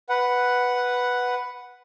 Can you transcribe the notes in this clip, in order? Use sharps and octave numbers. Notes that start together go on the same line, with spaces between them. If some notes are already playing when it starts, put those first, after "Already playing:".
B4 F#5